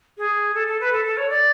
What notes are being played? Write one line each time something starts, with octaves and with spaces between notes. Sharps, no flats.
G#4
A4
A4
B4
A4
A4
C#5
D5